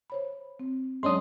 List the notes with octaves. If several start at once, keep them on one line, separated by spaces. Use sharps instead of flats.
C5 C#5 B5
C4
G2 F#3 G#3 C#4 D4 C6 D#6